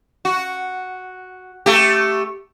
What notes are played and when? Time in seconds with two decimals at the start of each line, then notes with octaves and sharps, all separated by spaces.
0.25 F#4
1.66 A3 G4